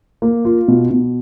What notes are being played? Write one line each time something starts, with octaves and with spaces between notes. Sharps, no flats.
A#3
F4
B2
B2